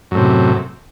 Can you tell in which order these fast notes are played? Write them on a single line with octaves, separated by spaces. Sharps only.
F#2 A2 C3